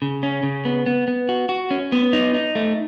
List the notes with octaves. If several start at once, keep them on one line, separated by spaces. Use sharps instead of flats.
C#3
C#4
C#3
B3
B3
B3
F#4
F#4
C#4
B3
D#4
D#4
A3